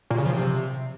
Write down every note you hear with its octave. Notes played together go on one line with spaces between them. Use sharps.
A#2
C#3
F3
C3